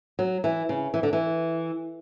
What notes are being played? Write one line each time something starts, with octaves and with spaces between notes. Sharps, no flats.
F#3
E3
C#3
E3
D3
E3